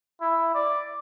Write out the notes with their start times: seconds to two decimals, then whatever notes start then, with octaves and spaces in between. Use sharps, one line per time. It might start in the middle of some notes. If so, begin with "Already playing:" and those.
0.21 E4
0.54 D5